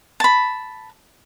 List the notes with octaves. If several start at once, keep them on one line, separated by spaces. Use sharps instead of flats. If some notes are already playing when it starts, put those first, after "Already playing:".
A5 B5